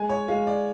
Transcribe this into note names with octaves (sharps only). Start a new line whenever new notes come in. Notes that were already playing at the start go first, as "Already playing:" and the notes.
Already playing: G#3 G#5
C#5
G#3 F5
D5